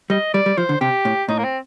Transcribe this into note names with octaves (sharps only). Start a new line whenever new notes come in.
G3 D#5
G3 D5
G3
F3 C5
D3
C3 G4
A2
A2 D#4
A#3
C4